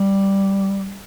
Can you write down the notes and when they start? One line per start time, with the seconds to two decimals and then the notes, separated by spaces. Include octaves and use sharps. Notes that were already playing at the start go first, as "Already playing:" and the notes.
Already playing: G3